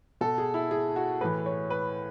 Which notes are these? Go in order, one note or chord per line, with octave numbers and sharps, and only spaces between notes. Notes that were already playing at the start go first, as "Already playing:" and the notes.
B2 A4
G#4
E4
G#4
F#4
A2 E3 B4
C#5
B4